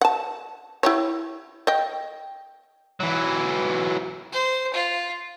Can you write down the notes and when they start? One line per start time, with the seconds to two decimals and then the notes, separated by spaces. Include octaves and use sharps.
0.01 F#5 A5
0.83 E4 G4 C#5
1.67 D#5 G5
3.00 E3 F#3
4.32 C5
4.73 F4